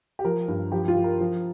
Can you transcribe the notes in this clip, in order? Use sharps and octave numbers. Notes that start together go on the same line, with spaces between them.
G4
F3 A#4
G2
F3 G4
F4
F3
A#4
F3